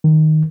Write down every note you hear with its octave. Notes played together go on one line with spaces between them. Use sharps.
D#3